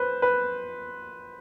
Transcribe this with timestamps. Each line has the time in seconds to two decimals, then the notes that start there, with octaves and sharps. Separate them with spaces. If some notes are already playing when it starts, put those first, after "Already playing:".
Already playing: B4 C5
0.22 B4